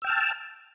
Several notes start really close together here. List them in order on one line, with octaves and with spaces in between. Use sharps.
E6 G5 F6 A5